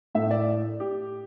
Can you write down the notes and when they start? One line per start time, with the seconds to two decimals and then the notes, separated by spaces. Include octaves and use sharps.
0.15 A2 A3 E4 E5
0.31 D5
0.80 G4